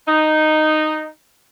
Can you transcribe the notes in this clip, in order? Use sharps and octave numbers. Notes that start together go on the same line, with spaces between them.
D#4